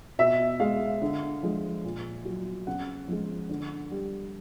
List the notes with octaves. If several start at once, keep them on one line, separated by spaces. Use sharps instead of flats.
B2 E5
G#3 F5
D3
F3 G#3
A#2
F#3
C#3 F#5
F3 G#3
D3
G3